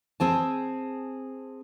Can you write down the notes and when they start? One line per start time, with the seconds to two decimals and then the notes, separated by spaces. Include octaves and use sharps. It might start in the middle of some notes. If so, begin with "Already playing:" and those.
0.20 C4 G#4 A5